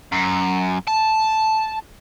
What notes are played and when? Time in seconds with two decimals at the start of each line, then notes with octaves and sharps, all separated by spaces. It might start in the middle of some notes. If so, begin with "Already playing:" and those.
0.12 F#2
0.87 A5